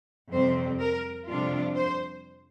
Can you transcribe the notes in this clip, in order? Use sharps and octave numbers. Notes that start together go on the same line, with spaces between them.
F2 C3 G3 C4 C5
A#4
F2 C3 G3 D4 F4
C5